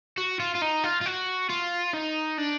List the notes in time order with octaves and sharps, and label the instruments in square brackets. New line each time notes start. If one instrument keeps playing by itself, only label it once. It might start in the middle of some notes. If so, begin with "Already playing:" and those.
[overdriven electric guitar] F#4
F4
F4
D#4
F4
F4
F#4
F4
D#4
D4